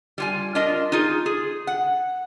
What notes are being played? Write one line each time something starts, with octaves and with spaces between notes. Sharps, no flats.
G3 F4 G#5
D4 F4 A#4 D#5
D#4 F4 G#4
G#4
F#5